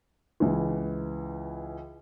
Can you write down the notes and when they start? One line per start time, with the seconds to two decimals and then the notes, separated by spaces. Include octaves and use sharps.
0.40 C#2 E3